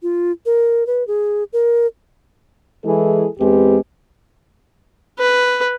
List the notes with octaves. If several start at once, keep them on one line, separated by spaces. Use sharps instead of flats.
F4
A#4
B4
G#4
A#4
E3 G#3 E4 G#4 A4
E2 G#3 C4 G4 B4
B4